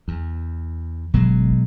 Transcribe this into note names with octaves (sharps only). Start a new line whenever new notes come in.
E2
G1 B2 F#3 G#3